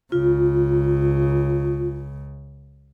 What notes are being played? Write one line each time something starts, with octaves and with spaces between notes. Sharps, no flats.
C#2 C#3 F4